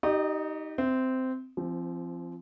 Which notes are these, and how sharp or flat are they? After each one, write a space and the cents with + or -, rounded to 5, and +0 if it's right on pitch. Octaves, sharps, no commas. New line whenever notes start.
D#4 +10 G4 -20 D#5 -45
C4 -15 E5 +0
F3 -30 C4 +0